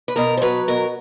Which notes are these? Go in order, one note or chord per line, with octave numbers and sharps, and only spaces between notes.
B4
B2 A#4
C5
F#3 B4
B2 A#4